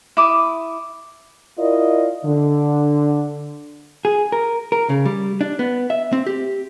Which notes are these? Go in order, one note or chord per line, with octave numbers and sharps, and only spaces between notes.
E4 D6 D#6
E4 F4 A#4 D5 D#5
D3
G#4
A#4
A#4
C#3
G3
D4
B3
E5
C4
G4